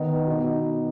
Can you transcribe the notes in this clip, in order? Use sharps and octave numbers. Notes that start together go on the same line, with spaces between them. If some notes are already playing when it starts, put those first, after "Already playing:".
Already playing: D#3 B3 D#4
B2 B3 D#4